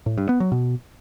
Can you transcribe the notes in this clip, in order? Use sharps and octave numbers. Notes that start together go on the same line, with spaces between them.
A2
G2
B3
F#3
B2